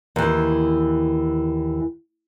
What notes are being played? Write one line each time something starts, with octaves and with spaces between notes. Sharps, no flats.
D#2 E3